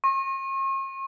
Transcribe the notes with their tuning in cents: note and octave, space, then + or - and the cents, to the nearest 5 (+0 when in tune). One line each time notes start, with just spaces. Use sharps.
C#6 -45